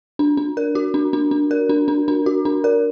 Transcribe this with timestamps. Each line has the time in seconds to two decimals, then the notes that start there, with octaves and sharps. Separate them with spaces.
0.19 D4
0.37 D4
0.57 A#4
0.75 F#4
0.94 D4
1.13 D4
1.31 D4
1.51 A#4
1.69 D4
1.88 D4
2.08 D4
2.26 F#4
2.45 D4
2.64 A#4